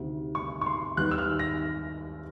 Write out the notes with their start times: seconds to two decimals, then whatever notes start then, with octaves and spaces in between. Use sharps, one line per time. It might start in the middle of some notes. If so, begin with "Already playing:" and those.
Already playing: D2 C3 D#3
0.35 C#6
0.61 C#6
0.66 C6
0.97 D#2 D#3 G3 B3 F#6
1.11 E6
1.18 F6
1.39 A#6